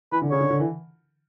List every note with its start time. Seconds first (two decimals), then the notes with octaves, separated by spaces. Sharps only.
0.12 E3 B4
0.22 D3
0.31 C#3 C#5
0.41 D3
0.51 D3
0.60 E3